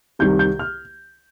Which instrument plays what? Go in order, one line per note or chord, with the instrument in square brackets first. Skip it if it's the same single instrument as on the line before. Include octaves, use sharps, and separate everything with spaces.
[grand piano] C2 C3 D#3 G3 G6
G6
F6